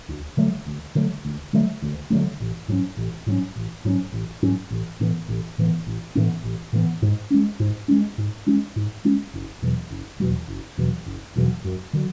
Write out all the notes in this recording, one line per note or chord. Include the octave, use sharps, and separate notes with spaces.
D2
D3 F#3 A3
D2
D3 F#3 A3
D2
D3 F#3 A3
D2
D3 F#3 A3
A1
G#2 F#3 C#4
A1
G#2 F#3 C#4
A1
G#2 F#3 C#4
A1
G#2 F#3 C#4
A1
A2 E3 B3
A1
A2 E3 B3
A1
A2 E3 B3
A1
A2 E3 B3
G#2
G#3 C#4
G#2
G#3 C#4
G#2
G#3 C#4
G#2
G#3 C#4
F#1
E2 B2 F#3
F#1
E2 B2 F#3
F#1
E2 B2 F#3
F#1
E2 B2 F#3
F#2
D3 F#3